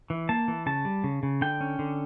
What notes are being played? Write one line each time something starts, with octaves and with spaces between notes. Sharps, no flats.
E3
A#3 A5
E3
C#3 A5
G3
C#3
C#3
D3 G5
C#4
D3